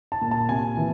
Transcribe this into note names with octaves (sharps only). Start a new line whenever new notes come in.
A5
A#2
A5
C3 G#5
E3